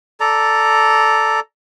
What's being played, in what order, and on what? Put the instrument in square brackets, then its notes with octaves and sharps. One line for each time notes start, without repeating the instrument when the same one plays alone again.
[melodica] A4 D5 A#5